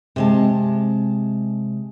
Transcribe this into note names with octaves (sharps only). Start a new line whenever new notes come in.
C3 G#3 A5